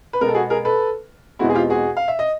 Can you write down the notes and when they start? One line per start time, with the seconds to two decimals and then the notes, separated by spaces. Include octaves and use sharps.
0.13 B4
0.21 B2 G#3 B3 A#4
0.28 A4
0.35 F#4 G#4
0.50 G#4 A#4
0.65 A4 B4
1.39 E2 B2 G#3 C4 E4 F#4
1.50 G#4
1.54 F4 G4
1.70 F#4 G#4
1.97 F5
2.08 E5
2.19 D#5